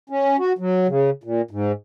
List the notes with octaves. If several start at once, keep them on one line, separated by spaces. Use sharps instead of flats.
C#4
F#4
F#3
C#3
A#2
G#2